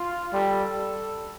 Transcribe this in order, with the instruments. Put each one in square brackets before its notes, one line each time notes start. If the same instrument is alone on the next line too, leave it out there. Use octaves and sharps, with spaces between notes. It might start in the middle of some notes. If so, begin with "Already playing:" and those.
Already playing: [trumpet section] F4
[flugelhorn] G3 [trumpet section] A4